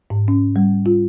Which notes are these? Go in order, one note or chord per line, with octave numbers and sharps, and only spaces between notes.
G#2
C#4
G3
F4